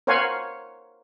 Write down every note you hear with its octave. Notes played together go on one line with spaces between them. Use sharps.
A#4 C5 C#5 F5 F#5 G#5